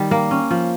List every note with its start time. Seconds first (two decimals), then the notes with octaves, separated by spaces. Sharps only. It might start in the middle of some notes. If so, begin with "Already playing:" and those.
Already playing: D#3 G3
0.11 A#3
0.31 C#4
0.51 F3